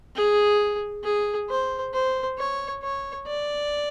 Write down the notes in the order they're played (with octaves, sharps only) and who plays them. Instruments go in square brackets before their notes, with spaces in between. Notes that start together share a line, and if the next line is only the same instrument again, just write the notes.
[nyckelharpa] G#4
G#4
C5
C5
C#5
C#5
D5